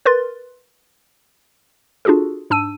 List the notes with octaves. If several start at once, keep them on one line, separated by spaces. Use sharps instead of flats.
A#4 B4 C6 A6
D4 F4 F#4 G#4 A4
G#2 D4 A5 E6 D#7